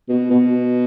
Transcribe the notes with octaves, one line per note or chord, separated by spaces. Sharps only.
B2
B2